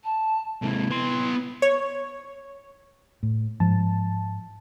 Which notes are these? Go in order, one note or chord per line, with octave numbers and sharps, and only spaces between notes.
A5
G#2 C3 E4
B3 C6
C#5
A2
G#2 F3 A5